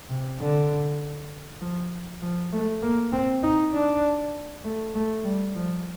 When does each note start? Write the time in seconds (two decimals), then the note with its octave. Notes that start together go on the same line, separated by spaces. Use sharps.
0.09 C3
0.40 D3
1.61 F3
2.22 F3
2.52 A3
2.82 A#3
3.12 C4
3.43 D#4
3.73 D4
4.64 A3
4.95 A3
5.24 G3
5.55 F3